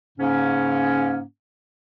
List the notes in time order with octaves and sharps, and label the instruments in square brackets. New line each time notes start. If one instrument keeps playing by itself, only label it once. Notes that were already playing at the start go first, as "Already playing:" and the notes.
[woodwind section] G#2 C#3 A#3 C#4